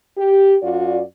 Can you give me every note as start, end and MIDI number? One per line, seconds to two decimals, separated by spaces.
0.17 0.56 67
0.62 1.01 42
0.62 1.01 65
0.62 1.01 66
0.62 1.01 74